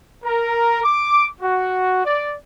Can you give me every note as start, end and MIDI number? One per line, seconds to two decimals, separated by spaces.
0.24 0.81 70
0.84 1.26 86
1.41 2.05 66
2.05 2.33 74